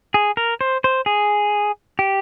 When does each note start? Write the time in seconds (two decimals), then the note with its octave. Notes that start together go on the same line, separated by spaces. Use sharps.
0.14 G#4
0.37 A#4
0.61 C5
0.84 C5
1.06 G#4
1.99 G4